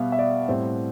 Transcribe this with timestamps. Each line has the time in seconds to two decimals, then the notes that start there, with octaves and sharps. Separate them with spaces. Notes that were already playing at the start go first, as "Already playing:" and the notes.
Already playing: B2 G3 B3 E5 F5
0.12 E5
0.19 D5
0.48 A2 G3 C4